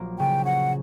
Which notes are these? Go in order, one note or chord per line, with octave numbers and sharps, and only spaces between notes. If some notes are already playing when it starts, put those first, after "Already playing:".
Already playing: A#1 F#3 A#3
C#3 G5
C#4 F#5